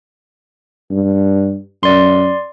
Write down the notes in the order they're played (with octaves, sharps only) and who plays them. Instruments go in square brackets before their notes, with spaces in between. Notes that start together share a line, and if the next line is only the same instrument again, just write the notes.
[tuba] G2
[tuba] F#2 [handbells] D5 C6